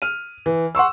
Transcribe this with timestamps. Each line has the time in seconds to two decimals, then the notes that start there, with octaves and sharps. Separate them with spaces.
0.02 F6 D#7
0.46 E3
0.75 F#5 C6 C#6 E6